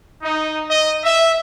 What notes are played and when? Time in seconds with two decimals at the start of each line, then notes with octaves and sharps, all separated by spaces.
0.21 D#4
0.68 D#5
1.03 E5